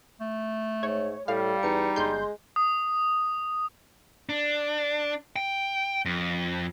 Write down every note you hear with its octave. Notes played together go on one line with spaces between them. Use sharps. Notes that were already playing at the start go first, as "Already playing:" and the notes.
A3
G#2 C#5
A2 G3 F5
E2 D#4 C#7
G1 G#3 C6 G6
D#6
D4
G5
F2